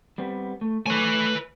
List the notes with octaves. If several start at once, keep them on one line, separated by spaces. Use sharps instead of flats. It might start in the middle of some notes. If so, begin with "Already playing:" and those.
G3 B3 C4
A3
A3 A4 B4 C#5 G#5